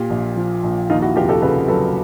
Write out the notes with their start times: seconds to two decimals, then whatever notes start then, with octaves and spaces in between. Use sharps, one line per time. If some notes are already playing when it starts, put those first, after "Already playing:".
Already playing: A#2 F4 G4
0.10 A#1
0.36 F3
0.63 A#1
0.90 D#2 D#4 F4
1.02 E4 F#4
1.16 F1 F4 G4
1.29 G4 A4
1.42 C#3 A4 B4
1.68 F#3 A4 B4